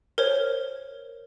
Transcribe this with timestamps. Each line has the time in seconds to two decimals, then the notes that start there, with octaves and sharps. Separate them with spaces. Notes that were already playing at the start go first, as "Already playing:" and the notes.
0.18 A#4 C5 C#5